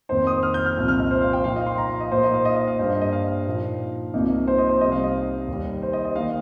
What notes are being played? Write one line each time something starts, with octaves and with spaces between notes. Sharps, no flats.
F2 D#3 A#3 D#4 C5
D#6
F6
G6
F6
C2 A#2 F3 C4
F6
D#5
C5
F5
G5
A#2 F3 A#3 D#4 F5
D#5
C6
A#5
F5
D#5
A#2 A#3 D#4 C5
D#5
F5
D#5
D#5
F5
G2 G3 A#3 C5
D#5
D#5
F5
A#2 F3 D#4
C2 C3 F3 A#3 D#4
C5
D#5
C5
C2 C3 G3 D#4 D#5
F5
D#5
D#2 D#3 G3
C5
D#5
D#5
D#3 A#3 D#4 F5